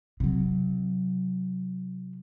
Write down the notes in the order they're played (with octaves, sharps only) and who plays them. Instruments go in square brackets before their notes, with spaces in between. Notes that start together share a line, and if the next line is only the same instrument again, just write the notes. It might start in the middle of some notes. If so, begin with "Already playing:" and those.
[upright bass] C3 F#3